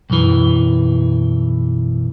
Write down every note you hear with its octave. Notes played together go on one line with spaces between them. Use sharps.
B1 F#2 E3